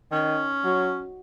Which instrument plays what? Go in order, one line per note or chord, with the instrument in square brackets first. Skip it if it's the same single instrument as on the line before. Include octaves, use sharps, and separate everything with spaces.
[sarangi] D#3 [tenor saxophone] C#4
[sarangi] F#3